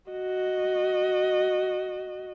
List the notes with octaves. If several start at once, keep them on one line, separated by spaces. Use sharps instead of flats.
F#4 D#5